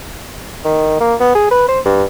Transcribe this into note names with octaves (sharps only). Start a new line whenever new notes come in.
D#3
A#3
B3
G#4
B4
C5
G2